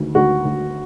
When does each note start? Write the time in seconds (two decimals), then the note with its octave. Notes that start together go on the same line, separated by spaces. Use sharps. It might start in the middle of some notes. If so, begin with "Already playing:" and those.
Already playing: D2 D#3
0.15 D2 F#4
0.45 D2